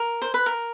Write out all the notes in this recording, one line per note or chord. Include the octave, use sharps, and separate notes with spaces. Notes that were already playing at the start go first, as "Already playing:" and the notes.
Already playing: A#4
C5
B4
A#4